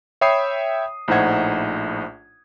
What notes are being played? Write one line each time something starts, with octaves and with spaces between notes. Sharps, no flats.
C#5 E5 G5 B5 D#6 C7
A#1 A2 D#4 C5 F#5 G#6